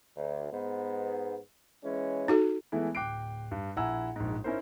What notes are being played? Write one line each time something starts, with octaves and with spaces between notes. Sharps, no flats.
D2
G#2 B3
E3 G#3 C#4
D#4 F#4 A4
E3 G#3 A3 B3 E4
D1 G5 D6 F#6 C7 D7
G2
A#1 E4 F#5 G#5 A#5 E6
A#1 G#2
C#4 D#4 E4 A#4 C5